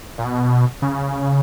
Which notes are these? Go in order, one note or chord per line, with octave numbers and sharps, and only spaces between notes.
A#2
B2
C#3